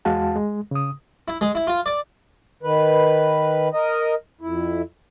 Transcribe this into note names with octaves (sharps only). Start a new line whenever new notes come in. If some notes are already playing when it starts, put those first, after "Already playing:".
E2 G#3 F#4 F5 A5
G#3
C#3 D#6
E4
G#3
E4
F4
D5
D#3 B4
A#4 D#5
F2 E4